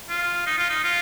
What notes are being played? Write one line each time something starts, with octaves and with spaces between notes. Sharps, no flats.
F4
D#4
F4
D#4
F4